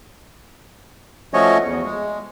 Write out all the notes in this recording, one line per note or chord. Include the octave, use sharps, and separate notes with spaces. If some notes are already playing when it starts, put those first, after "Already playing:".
F3 A3 C#4 F#4 C#5 D#5
E2
G#3